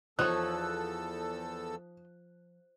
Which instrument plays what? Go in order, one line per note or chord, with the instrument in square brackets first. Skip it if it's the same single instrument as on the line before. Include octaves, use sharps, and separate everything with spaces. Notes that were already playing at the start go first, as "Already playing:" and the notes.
[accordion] E2 A4 E6 [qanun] F3 [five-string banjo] D#4 C#5 [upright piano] F#6